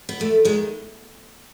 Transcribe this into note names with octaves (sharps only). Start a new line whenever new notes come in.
B3
E2 A3
D#3 G#3